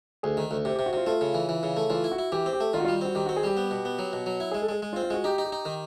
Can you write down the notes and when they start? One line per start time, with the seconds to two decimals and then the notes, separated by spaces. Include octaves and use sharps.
0.23 D2 G#4
0.37 D#3
0.51 D2
0.65 C3 G4
0.76 G4
0.79 C3
0.86 F#4
0.93 C3 F4
1.06 A3 F4
1.21 C#3
1.34 E3
1.49 E3
1.63 C#3
1.77 A3
1.90 E3 F4
2.04 E4
2.12 F#4
2.18 E4
2.32 E3 G4
2.46 C4
2.53 G4
2.60 A3
2.73 D#3 F4
2.80 F#4
2.85 F4
2.88 G3
3.01 C4 F#4
3.15 D#3 G4
3.26 F#4
3.29 C4
3.36 G#4
3.43 G3 G4
3.57 B3
3.71 B2
3.85 B3
3.99 F#3
4.13 B2
4.26 F#3
4.40 E4
4.51 G#4
4.54 G#3
4.62 A4
4.69 G#3 G#4
4.82 G#3
4.93 F4
4.96 C4
5.03 F4
5.10 G#3 F#4
5.24 D#4 G4
5.38 D#4
5.45 G4
5.52 D#4
5.65 D#3